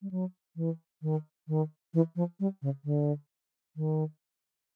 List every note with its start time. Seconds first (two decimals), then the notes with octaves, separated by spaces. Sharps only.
0.02 G3
0.11 F#3
0.56 E3
1.02 D#3
1.48 D#3
1.94 E3
2.16 F3
2.40 G3
2.62 C#3
2.85 D3
3.76 D#3